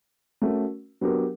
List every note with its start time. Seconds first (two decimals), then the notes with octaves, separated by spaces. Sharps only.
0.42 A3 C#4 F#4 A#4
1.01 F#3 B3 D4 G4 A#4